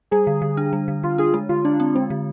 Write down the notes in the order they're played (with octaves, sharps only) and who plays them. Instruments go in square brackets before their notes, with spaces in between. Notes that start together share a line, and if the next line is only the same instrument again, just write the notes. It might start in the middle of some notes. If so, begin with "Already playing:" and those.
[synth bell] G3 [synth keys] G#4
[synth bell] D3
D3
D4
G3
D3
[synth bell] D3 [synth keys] F4
[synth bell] D4 [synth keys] G#4
[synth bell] G#3 [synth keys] G#4
[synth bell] D3 [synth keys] F4
[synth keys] D4 [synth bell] F4
[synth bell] C4
[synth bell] G#3 [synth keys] C4
[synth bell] D3